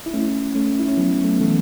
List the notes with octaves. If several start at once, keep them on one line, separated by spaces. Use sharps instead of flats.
E4
A3 C#4
A3 C#4
E4
C#4
F#3 B3
A3
B3
E3 A3